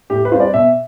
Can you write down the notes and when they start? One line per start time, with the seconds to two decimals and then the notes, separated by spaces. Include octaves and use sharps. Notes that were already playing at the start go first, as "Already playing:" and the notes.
0.10 A2 G4
0.25 B4
0.32 G3 C4 F4 C5
0.40 D5
0.54 B2 E5